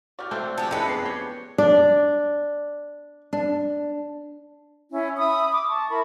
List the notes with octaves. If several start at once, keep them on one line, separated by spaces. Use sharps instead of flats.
E3 G3 F#4 D5 F6
A3 C4 D4 A4 E5 F5
F3 D4 G4 G#5
F#1 G#3 D#4 E4 B4 E5 C#7
B3 D4 C7
G4 C#5
D4 D5
D4
C#4 E4
E5 B5 D#6
D6
A5 C#6
E4 A#4 B5